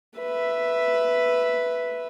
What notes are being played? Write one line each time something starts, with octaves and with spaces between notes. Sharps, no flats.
B4 E5